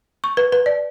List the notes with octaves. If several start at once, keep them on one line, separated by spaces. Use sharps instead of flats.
C#6
B4
B4
D5